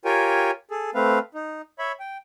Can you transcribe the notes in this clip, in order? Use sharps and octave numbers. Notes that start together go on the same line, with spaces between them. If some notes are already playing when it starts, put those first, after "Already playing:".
F4 G4 A#4 C#5 G5 G#5
G#4 A4
A3 C4 B4 F5
D#4
C#5 E5 B5
G5